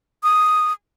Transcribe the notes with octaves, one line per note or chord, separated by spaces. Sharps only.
D#6